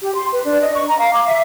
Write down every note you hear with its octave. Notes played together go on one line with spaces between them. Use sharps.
G4
C6
B4
D4
D#5
C#6
A#5
F5
D6
E5